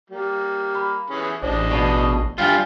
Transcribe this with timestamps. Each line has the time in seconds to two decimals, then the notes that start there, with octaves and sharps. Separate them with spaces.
0.10 G3 A#3
0.75 B5
1.10 E3 C#4 G#4
1.42 A1 D4 G#4 C5 D#5
1.71 B2 D5 A5 C7
2.38 G2 G3 F4 G#5 F6